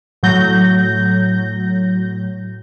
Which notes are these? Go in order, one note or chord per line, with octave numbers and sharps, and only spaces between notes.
A2 F#3 G6 A#6